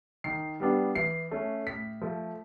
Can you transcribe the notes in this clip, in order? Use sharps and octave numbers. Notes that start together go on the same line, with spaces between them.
D#3 C7
G3 B3 D4
E3 C7
A3 C#4
A2 B6
F3 A3